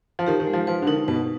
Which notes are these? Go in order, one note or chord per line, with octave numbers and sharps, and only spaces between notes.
F3
D#3 G4
D#3
G#3
F3
F3 B4
D3
D#3 D#4
B2 B4